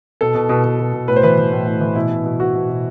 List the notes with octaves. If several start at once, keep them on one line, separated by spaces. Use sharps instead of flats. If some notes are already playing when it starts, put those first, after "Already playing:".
B2 A4
B2
B2
B2
B2
B2
A2 B4
C5
E3 B4
E3
A2
A2
E3
B2 E4
B2
B2
B2 F#4
B2
B2